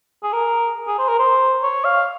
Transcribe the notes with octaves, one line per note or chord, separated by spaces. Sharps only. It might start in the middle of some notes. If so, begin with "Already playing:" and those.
G#4
A#4
G#4
C5
A#4
C5
C#5
F5